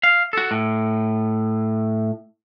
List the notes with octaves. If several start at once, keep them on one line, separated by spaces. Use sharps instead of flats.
F5
F#4 A4
A2